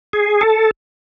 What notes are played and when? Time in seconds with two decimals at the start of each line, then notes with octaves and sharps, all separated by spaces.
0.13 G#4
0.41 A4